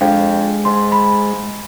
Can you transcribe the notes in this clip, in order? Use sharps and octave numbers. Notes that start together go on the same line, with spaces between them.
F2 G#3 D4 F5 G5
G#2 C6
B5